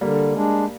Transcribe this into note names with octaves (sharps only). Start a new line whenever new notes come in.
D3 G3 A#3
G#3 D4